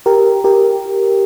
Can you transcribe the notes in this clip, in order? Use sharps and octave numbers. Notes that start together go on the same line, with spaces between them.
G4 A#4
G4 A#4